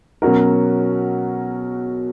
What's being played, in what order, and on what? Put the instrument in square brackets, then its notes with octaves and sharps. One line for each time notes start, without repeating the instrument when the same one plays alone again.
[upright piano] B2 F#3 C#4 F#4 A#4